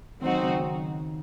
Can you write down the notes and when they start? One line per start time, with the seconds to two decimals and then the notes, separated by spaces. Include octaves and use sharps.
0.22 D#3 F#3 C4 D#4 F#4 C5
0.41 C#3
0.60 D#3